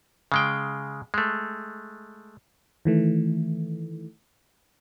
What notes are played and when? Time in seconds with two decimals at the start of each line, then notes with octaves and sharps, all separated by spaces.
0.32 C#3 G#3 G5
1.14 G#3 A3
2.85 D#3 E3 A3